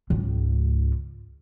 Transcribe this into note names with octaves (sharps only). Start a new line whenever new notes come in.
C#2 G#2